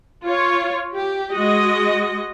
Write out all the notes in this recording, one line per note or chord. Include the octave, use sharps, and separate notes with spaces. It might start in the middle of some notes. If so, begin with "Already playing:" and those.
F4 C#5
G4
G#3 F#4 D#5